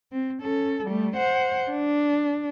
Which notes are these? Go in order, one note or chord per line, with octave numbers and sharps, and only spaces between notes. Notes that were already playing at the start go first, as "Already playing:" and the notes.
C4
C#4 A4
G3 A3
C5 F#5
D4